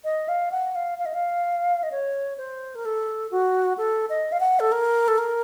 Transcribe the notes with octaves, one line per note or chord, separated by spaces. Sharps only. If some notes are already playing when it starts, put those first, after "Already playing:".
D#5
F5
F#5
F5
F5
D#5
F5
D#5
C#5
C5
A#4
A4
F#4
A4
D#5
F5
F#5
A4
A#4
A4
A#4